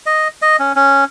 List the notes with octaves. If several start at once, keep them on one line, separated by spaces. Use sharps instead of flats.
D#5
D#5
C#4
C#4